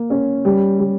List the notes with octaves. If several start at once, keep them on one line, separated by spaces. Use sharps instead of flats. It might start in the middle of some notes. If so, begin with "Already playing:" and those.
Already playing: A#3
C#4
G3
G3